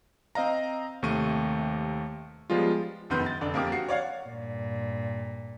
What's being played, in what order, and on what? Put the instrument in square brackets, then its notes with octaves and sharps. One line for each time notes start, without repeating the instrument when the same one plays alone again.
[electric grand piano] C4 D#5 F5 A#5
D#2 C3 A3 C#6 D#7
F3 G3 G#3 B3 F4
[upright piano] F1 F#2 D#3 B3 C6 G6
A6
F1 D3 D4
F2 A#3 G4 A#4 D6
F#4 C7
C#5 D5 F5 F#5
[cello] G2 A#2